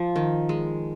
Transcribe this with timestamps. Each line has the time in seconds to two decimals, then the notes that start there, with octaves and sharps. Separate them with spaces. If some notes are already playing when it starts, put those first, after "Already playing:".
Already playing: F3
0.16 D#3
0.49 G#3